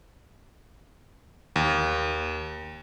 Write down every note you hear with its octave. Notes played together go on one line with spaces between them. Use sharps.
D#2